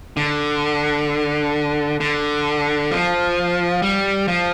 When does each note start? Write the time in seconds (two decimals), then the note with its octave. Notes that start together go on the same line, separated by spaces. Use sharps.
0.17 D3
2.00 D3
2.91 F3
3.82 G3
4.28 F3